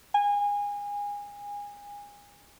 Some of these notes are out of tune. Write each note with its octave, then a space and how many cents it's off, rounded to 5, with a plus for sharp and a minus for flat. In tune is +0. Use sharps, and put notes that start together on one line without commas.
G#5 -25